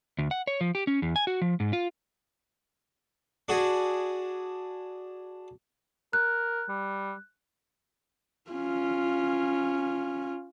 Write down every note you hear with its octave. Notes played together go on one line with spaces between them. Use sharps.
D2
F#5
C#5
F3
G4
C#4
E2
G#5
F#4
F3
G#2
F4
D4 F#4 G#4
A#4 F#6
G3
C#4 F4